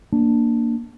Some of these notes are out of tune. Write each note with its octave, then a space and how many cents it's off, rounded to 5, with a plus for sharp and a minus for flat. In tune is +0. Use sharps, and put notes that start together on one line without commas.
A#3 +0 D4 +0